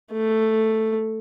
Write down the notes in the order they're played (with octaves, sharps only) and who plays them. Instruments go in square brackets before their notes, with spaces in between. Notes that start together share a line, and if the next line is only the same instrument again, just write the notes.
[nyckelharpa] A3